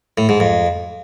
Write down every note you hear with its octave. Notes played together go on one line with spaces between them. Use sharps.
A2
G#2
F2